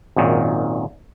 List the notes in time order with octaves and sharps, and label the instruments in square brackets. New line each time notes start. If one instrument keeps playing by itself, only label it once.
[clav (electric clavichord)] G#1 F#2 A#2 D#3